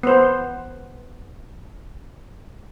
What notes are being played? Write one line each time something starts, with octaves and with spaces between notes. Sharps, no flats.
B3 C5